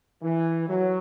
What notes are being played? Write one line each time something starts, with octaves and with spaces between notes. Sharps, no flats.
E3
F#3